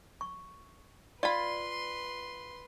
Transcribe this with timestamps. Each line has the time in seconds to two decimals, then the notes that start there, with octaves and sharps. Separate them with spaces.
0.21 C#6
1.23 F4 B4 D5 B5 C6